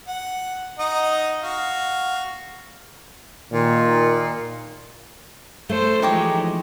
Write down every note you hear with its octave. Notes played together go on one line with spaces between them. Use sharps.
F#5
D#4 D#5 F#5
F#4 F5
A#2 D#3
A3 A4 C5
E3 F3 G#3 D#4 G4 C#5